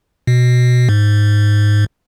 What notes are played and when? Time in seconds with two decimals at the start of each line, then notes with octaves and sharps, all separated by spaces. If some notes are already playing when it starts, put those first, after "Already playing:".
0.27 B2
0.89 G#2